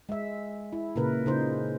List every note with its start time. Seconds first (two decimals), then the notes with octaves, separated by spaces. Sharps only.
0.09 G#3 E5
0.73 E4
0.96 A#2 C#3 A#4 B4
1.26 C#3 D#4 C5